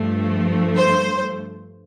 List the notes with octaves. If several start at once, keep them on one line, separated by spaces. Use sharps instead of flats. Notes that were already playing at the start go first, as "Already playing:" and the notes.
Already playing: G2 F3 A3
C5